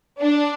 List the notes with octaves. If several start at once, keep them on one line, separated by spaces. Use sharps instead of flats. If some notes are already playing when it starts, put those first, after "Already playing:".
D4